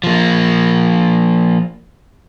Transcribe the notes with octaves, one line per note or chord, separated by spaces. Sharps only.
F3 A#3